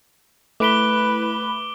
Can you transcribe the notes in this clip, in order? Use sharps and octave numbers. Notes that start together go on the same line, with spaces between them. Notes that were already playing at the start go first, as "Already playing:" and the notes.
A3 E4 B4 B5 D6 D7 G7